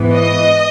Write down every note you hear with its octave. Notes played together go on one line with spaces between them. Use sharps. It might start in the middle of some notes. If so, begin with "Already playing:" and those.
Already playing: G#2 E3 B3
D#5